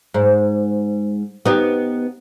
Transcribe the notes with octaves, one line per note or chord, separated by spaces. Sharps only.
G#2
B3 D#4 G4